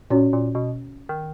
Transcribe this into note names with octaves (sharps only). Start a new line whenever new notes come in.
A#2 C#4 F#4 C#5
A#2
B2
D#3